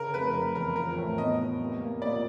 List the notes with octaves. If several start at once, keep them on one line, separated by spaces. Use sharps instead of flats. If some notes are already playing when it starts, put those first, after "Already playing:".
Already playing: C#3 A#4
F1 B4
F1 A#4
E2 A#4
F3 A#4
A2
B3 D#5
B3
C2
A#3
A#2 D5